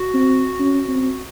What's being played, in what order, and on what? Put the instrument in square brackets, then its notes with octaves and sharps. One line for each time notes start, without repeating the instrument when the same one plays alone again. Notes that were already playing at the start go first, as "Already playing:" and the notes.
Already playing: [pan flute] F#4
[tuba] C4
C#4
C4